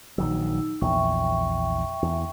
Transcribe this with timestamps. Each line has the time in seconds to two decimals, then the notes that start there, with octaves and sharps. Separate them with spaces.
0.18 A#1 D#3 F#3 D#4 E6
0.81 A#1 E2 E5 G5 C#6
2.02 E2